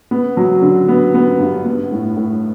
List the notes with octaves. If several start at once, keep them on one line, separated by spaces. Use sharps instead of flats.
B3
F#3
D3
B3
B3
G2
B3
A2
A2